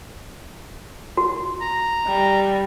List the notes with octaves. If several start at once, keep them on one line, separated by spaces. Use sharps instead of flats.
F#4
A#5
G3